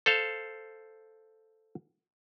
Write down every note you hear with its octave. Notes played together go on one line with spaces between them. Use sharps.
A4 C5 F5